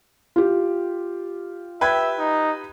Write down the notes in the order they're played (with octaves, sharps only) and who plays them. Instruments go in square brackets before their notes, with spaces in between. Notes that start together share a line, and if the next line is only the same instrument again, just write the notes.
[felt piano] F4 G4
[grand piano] B4 G5 G#6 [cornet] E5
[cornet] D#4